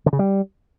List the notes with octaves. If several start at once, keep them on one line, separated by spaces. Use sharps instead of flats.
D3
C#3
G3